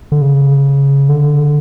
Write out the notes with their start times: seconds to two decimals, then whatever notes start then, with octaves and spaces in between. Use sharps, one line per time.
0.12 D3
0.21 C#3
1.09 D3